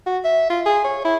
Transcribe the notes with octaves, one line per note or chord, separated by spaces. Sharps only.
F#4
E5
F4
G#4
C#5
E4